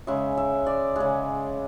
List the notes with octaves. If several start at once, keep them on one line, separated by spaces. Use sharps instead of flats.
C#3 G#3 E5
E5
D5
C#3 G#3